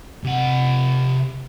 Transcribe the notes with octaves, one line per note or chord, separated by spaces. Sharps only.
C3 F#5